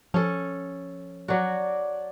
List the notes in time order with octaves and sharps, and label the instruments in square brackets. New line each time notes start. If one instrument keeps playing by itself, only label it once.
[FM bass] F3 [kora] C#4 A4
[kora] F#3 F#4 [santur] D5 A5